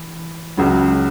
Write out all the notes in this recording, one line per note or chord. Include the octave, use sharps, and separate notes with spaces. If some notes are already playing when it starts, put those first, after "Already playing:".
Already playing: E3
C#2 C#3 F#3